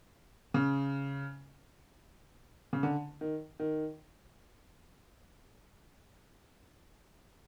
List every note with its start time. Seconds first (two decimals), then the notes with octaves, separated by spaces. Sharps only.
0.54 C#3
2.73 C#3
2.83 D3
3.21 D#3
3.60 D#3